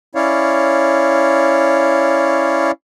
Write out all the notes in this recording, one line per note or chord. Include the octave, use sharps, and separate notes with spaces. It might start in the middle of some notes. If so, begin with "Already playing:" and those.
C#4 E4 C#5 D5 F5